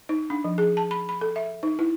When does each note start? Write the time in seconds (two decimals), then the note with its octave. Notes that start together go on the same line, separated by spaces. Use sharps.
0.09 D#4
0.30 D4
0.44 F3
0.58 G#4
0.77 A5
0.91 B5
1.09 B5
1.21 A4
1.36 E5
1.63 D#4
1.79 E4